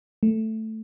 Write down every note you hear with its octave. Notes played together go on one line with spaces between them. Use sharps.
A3